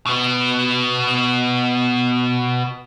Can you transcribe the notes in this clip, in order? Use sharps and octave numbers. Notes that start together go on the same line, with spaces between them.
B2 B3